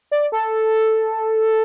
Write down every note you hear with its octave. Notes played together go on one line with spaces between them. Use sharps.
D5
A4